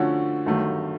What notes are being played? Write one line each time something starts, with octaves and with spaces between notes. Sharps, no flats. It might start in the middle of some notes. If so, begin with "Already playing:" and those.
Already playing: D3 F3 A3 C#4 F#4
G1 G2 D#3 F#3 A3